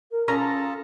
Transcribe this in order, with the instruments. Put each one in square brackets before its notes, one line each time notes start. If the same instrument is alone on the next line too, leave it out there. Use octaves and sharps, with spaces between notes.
[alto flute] A#4
[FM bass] C#4 [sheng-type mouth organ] F4 A4 A5 [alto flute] G#4 [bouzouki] A#5